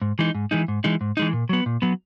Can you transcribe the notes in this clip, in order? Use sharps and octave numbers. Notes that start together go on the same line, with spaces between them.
G#2
E3 G#3 D#4
G#2
E3 G#3 D#4
G#2
E3 G#3 D#4
G#2
E3 G#3 D#4
A#2
F#3 B3
A#2
F#3 B3